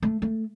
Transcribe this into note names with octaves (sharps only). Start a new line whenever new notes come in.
A3
A3